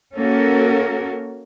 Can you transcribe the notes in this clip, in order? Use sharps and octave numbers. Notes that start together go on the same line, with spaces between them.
A#3 C#4 F#4 A4 A#4